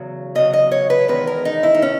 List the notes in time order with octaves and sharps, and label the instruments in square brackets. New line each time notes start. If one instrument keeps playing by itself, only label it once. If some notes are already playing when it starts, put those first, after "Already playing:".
Already playing: [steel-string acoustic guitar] E2 C#3 F#3
E2 C#3 F#3 D#5
D#5
C#5
B4
E2 D#3 G#3 B4
A#4
D#4
E4
D#4
D#3 C#4